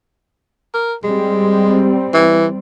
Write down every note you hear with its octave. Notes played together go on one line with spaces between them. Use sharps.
A#4
G3 G#3 C4
E3